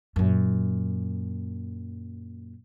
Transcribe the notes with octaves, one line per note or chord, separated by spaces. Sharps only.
F#2 A#2